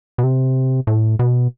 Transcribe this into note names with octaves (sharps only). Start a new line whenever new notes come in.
B2
C3
A2
B2